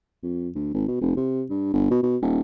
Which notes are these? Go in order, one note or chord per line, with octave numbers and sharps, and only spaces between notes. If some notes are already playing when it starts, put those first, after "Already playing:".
F2
D2
G#1
B2
F1
C3
G2
G1
B2
B2
D#1